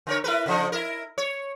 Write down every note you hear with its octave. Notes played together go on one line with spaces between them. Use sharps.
D3 A#4 C#5
E4 A#4 B4
C#3 F3 D#4
E4 A#4
C#5